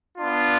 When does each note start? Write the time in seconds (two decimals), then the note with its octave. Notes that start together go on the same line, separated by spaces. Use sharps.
0.17 B3 D4 F4